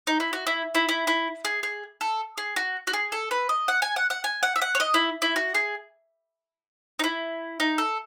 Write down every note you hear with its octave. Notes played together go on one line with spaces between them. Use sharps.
D#4
E4
F#4
E4
E4
E4
E4
G#4
G#4
A4
G#4
F#4
F#4
G#4
A4
B4
D#5
F#5
G#5
F#5
F#5
G#5
F#5
E5
F#5
C#5
D#5
E4
E4
F#4
G#4
D#4
E4
D#4
A4